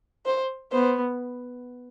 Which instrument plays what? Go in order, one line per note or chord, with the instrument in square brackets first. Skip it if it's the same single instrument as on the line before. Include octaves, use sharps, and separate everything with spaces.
[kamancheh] C5
[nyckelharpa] B3 [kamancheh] C5